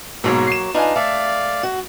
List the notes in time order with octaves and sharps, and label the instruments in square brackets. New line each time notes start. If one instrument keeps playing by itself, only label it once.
[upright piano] G#2 B2 [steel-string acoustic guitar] F#3 A#3 C#5
[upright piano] C7 E7
[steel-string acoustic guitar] D4 D#4 F4 [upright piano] B4 F5 G#5
[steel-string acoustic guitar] A3 [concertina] D5 F5 [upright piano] E5
[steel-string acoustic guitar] F#4